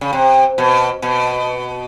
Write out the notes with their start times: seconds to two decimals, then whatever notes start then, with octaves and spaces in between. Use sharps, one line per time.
0.01 C#3
0.13 C3
0.58 B2
1.02 B2